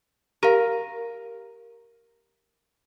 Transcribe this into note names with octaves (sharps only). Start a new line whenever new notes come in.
G4 A#4 F5